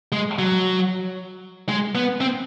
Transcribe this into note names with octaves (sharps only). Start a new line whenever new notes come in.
G#3
F#3
G#3
B3
C4